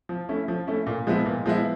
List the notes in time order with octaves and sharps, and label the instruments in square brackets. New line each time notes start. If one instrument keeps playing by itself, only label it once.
[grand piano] F3
A3 C#4 E4
F3
A3 C#4 E4
A#2
F3 G#3 B3 E4
A#2
F3 G#3 B3 E4